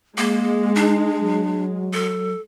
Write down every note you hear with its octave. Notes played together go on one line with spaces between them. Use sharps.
G#3 A#3
D4 D#4
F#3
A4